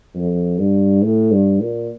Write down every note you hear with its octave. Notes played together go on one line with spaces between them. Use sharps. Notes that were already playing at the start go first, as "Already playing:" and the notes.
F2
G2
A2
G2
A#2